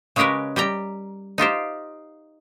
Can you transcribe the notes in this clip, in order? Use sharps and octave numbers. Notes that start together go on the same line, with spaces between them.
C#3 G#3 C#4 G4 A#4 B4
G3 G4 G5 A#5
D#4 F4 G4 C5